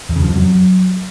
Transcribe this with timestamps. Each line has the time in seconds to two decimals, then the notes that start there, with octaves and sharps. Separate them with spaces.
0.09 E2
0.16 C#3
0.23 F3
0.29 F2
0.36 F#3